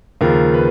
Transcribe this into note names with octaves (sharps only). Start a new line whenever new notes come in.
D#2 C#3 F3 A#4
B4